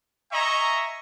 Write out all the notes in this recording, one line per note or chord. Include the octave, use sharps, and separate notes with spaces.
D#5 E5 G#5 A#5 C#6